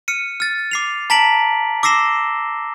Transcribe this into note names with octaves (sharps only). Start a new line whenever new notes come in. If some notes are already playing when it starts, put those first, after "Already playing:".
F6 C#7 D#7
F6 A6
D6 C7 F7
A5 A#5 B6 D7 F#7
D6 E6 A#6 C7 E7 G7